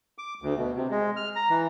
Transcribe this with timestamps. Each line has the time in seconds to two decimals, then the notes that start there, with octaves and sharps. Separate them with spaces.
0.18 D6
0.42 D2
0.58 B2
0.76 C3
0.90 G#3
1.16 F6
1.36 A#5
1.50 E3